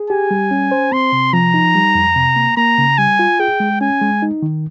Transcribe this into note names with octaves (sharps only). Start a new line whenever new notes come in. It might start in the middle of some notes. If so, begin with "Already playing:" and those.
Already playing: G#4
G4 G#5
G3
C#4
C5
C4 C6
C3
F3 A#5
D#4
G3
F2
C3
A#3
A#3 A#5
C#3
G3 G#5
F4
G#4 G5
G#3
C#4 G#5
G#3
D#4
D#3